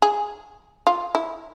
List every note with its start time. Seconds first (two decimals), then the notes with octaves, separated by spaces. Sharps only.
0.02 G#4
0.87 F4
1.15 E4